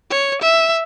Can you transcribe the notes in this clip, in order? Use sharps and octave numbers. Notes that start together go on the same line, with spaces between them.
C#5
E5